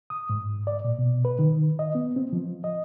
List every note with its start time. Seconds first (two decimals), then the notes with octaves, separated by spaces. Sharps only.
0.10 D#6
0.30 G#2
0.67 D5
0.85 A#2
0.99 B2
1.25 B4
1.39 D#3
1.79 D#5
1.95 B3
2.16 C4
2.33 F3
2.64 D#5